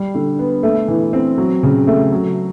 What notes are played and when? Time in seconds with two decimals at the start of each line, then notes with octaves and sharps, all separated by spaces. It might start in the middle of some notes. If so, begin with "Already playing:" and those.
Already playing: G3
0.15 D3
0.39 B3
0.63 A3
0.88 E3
1.13 C4
1.38 F#3
1.63 C#3
1.87 A3
2.12 F#3